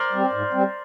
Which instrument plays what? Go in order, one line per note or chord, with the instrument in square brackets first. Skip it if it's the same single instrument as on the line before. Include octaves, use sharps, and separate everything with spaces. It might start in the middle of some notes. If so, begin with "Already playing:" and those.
Already playing: [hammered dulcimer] A#4 C5 D5
[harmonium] G3 C4
G#2
G3 C4